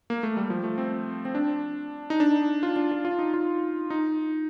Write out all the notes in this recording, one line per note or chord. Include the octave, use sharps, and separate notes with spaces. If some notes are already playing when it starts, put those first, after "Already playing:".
A#3
A3
G3
F3
A3
C4
C4
D4
D#4
D4
F4
D4
F4
F4
D#4
F4
D#4